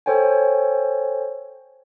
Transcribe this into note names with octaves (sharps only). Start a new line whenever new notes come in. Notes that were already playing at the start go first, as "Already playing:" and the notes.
A4 C5 C#5 G5 G#5